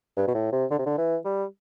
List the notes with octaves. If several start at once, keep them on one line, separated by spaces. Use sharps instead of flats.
G2
B2
A2
C3
D3
C3
D3
E3
G3